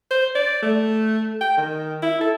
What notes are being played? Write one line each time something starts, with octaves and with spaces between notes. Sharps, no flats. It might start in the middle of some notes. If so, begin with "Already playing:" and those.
C5
D5
A3
G5
D#3
E4
A4